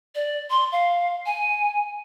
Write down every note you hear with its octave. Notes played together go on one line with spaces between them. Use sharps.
D5
C6
F5
G#5